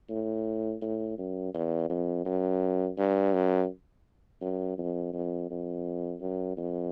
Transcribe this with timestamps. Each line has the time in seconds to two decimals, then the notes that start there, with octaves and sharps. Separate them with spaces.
0.10 A2
0.81 A2
1.18 F#2
1.54 E2
1.90 F2
2.25 F#2
2.98 G2
3.33 F#2
4.42 F#2
4.78 F2
5.13 F2
5.50 F2
6.21 F#2
6.57 F2